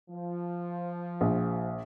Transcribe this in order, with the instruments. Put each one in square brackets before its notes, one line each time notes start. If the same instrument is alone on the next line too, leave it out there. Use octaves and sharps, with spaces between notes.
[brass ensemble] F3
[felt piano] A#1